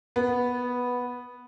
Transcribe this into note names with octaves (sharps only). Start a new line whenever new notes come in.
B3